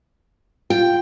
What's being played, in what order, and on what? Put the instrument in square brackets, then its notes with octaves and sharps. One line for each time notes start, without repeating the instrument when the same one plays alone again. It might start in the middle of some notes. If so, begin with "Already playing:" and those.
[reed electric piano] F4 [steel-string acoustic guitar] G5